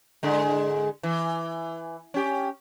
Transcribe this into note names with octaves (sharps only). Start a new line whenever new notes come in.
G#2 D3 G#3
E3
C#4 G4